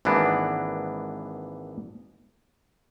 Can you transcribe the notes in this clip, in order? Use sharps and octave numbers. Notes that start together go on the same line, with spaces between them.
G#1 E3 A#3 B3 D4